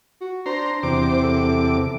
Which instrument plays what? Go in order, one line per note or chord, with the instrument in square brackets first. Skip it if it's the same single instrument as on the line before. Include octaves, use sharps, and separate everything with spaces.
[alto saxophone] F#4
[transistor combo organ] D4 A#5 C6 [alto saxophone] C5
[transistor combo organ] E2 C3 D6
[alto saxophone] A4